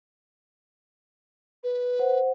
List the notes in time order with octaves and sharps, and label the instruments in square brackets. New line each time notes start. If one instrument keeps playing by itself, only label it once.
[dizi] B4
[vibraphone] C5 F#5